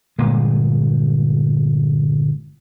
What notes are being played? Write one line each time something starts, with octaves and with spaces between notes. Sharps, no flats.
G1 A#2 G#3